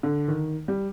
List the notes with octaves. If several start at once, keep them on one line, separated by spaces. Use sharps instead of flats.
D3
D#3
G3